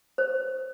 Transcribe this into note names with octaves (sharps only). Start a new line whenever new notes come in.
C5